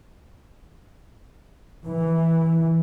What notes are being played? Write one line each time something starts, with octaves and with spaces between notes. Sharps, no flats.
E3